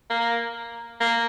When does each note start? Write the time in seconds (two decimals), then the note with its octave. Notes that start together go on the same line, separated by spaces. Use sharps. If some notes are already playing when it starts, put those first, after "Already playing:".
0.10 A#3
1.00 A#3